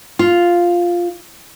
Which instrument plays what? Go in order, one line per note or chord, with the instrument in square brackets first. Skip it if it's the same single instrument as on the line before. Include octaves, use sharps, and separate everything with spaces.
[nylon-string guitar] F4